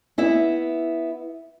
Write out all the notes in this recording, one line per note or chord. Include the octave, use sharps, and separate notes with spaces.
B3 E4 E5